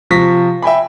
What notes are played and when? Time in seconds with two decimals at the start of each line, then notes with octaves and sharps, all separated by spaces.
0.10 C3 F3 C#6 A#6 B6
0.62 E5 G5 G#5 B5